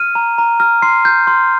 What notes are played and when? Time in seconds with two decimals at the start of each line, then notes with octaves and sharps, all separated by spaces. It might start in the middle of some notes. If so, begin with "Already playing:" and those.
Already playing: F6 D#7
0.15 A#5
0.38 A#5
0.60 F6
0.82 C6 C7
1.05 G6
1.27 C6